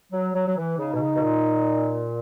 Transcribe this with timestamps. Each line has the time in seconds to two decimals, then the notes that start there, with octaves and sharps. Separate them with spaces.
0.12 F#3
0.34 F#3
0.46 F#3
0.56 E3
0.77 C#3 D#4
0.93 B2
1.00 C#3
1.15 B2
1.21 A#2